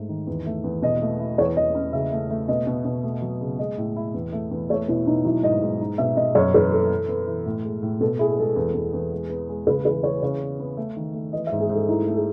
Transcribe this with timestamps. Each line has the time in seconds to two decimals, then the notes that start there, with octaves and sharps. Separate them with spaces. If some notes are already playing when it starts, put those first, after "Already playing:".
Already playing: G#2 A3
0.09 D#3
0.27 E2
0.46 A3
0.64 E2
0.82 B2 D#5
1.02 A3
1.20 E4
1.38 E2 C#5
1.56 E2 D#5
1.75 C#4
1.93 C#3 E5
2.12 A3
2.31 A3
2.48 B2 D#5
2.67 B2
2.85 B2
3.03 A3
3.22 F#3
3.41 C#3
3.59 G#3 D#5
3.78 A2
3.96 E4
4.14 E2
4.32 A3
4.51 E2
4.69 A3 C#5
4.88 B2 E4
5.07 B2 D#4
5.25 F#3 E4
5.43 G#2 D#5
5.62 G#2
5.81 D#4
5.98 B2 E5
6.16 B2 D#5
6.35 F#2 C#5
6.54 E3 B4
6.72 E3 A4
6.91 E3
7.09 B3
7.27 E3
7.46 A2
7.64 G#3
7.83 A2
8.01 B2 A4
8.19 E4 G#4
8.39 G#3 A4
8.56 E2
8.74 E2
8.93 E2
9.12 G#3
9.30 B3
9.49 G#3
9.67 C#3 B4
9.85 E3 B4
10.03 E3 C#5
10.22 C#3 C#5
10.40 B3
10.60 B3
10.77 A3
10.97 D#3
11.14 A3
11.33 E3 D#5
11.47 E5
11.52 G#2
11.60 G#4
11.69 G#2 A4
11.89 D#4 E4
12.07 A3
12.16 G#4